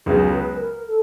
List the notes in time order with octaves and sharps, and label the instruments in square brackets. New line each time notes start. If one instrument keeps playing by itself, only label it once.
[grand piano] C#2 C#3 F#3 B3 [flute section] G#4
[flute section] B4
A#4
A4